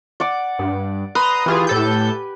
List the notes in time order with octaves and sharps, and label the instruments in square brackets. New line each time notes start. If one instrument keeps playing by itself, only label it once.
[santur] D5 F#5 D6
[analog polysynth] G2
[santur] B4 [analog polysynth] A#5 C6 D#6
[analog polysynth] E3 F4 G#4 [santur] G4 G#5
[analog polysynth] A2 A4 G6